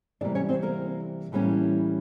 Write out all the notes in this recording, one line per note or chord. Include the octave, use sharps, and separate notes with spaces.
C3 E3 G3 A#3 D4 D5
C#4 C#5
C4 C5
A#3 A#4
A2 E3 G3 A#3 C#4